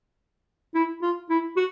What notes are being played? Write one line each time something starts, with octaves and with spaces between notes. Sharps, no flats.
E4
F4
E4
F#4